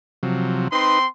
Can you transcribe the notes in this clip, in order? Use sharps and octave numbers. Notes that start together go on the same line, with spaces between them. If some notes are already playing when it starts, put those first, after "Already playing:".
C3 F3 F#3
C4 D#4 B4 C6